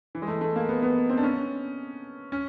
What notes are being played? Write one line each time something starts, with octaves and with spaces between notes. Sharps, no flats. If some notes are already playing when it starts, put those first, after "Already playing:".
E3
G#3
A3
A3
A#3
B3
B3
C4
D4
C#4
C#4